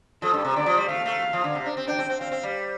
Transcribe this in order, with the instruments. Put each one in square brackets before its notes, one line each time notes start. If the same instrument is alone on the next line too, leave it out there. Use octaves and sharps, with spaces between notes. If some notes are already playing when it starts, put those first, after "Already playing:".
[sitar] F3 [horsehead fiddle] A4
[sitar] G2
C3
[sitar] D3 [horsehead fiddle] D5
[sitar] F3
G3
[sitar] A3 [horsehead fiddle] F5
[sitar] A3
F3
D3
C3
D4
C4
[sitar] D4 [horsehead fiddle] G5
[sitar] C4
C4
[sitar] C4 [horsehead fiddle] F5
[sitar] C4
G3